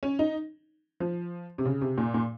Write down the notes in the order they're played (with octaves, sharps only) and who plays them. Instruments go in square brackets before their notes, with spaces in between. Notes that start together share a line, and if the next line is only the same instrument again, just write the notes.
[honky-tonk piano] C#4
D#4
F3
C3
C#3
C3
A#2
A#2